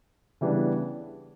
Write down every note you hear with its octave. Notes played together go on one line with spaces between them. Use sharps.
C#3 E3 G3 B3 D4